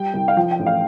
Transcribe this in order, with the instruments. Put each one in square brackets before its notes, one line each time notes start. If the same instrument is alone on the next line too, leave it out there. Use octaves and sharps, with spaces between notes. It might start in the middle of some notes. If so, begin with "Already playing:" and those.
Already playing: [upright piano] G3 G5
C2
F5
F3 G5
G5
A1
F5